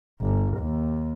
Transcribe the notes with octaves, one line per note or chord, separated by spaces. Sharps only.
G1
D#2